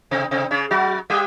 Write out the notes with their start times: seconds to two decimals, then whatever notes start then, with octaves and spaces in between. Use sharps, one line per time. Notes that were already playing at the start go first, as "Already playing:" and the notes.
0.11 C3 C4
0.31 C3 C4
0.51 C#3 C#4
0.71 F#3 F#4
1.10 G3 G4